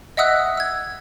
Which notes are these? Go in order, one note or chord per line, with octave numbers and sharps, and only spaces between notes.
D#5 E5 F#5 D#6 E6 F#6
E6 G#6